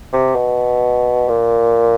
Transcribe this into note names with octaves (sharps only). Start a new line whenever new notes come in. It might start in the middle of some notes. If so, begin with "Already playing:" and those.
C3
B2
A#2